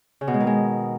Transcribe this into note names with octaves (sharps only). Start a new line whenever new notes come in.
C#3
B2
G#3
D#3
G#3